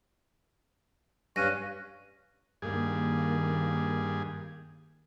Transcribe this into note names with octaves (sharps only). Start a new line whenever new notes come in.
G2 C#4 F5 C#6 F#6 A#6 D#7
G2 D#3 A#3 G#4